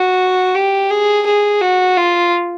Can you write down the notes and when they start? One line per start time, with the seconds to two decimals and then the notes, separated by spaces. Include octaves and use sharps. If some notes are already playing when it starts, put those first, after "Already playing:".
Already playing: F#4
0.55 G4
0.90 G#4
1.26 G#4
1.61 F#4
1.97 F4